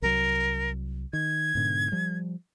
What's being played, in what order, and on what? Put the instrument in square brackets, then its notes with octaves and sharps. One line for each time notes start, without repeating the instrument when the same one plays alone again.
[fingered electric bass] C2 F#3 [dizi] A#4
[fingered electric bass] D#3 [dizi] G#6
[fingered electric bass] G#2 B2 D3
F3 G3